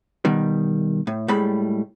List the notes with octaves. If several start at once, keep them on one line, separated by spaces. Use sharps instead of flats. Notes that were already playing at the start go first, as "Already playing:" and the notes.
B2 D#3 G3
A2
A2 G3 G#3 B5